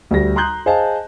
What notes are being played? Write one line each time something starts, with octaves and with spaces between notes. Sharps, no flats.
D2 G3 A#6
A#5 C6 D#6 F#6 G6
G#4 C5 D#5 F5 G#5 A5